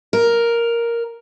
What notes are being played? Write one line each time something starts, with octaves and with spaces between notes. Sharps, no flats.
A#4